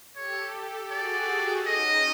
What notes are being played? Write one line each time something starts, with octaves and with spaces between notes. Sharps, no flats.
G4 A4 C#5
F#4 G#4 D5
G4 A4
C#4 D#4 D#5